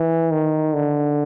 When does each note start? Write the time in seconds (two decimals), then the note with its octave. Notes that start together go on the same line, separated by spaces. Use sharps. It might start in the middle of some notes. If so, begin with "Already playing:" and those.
Already playing: E3
0.33 D#3
0.74 D3